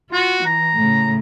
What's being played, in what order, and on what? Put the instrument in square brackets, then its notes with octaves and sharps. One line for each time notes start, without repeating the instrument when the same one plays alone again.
[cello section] F4 [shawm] F#4
[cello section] E3 [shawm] A#5
[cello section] A2 C#3